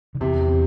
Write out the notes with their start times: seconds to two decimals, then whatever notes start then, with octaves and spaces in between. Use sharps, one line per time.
0.15 D3
0.20 E2 C3 E3